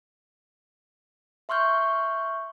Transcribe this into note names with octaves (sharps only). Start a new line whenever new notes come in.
E5 C6 C#6 F6 G6